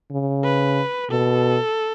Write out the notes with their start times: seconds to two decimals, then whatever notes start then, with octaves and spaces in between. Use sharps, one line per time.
0.11 C#3
0.44 B4
1.10 B2 A4